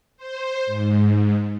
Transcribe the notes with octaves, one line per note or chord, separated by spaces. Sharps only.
C5
G#2